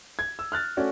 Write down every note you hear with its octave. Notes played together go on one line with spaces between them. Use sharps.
G#6
E6
F6 F#6 A6
A3 C#4 F#4 D5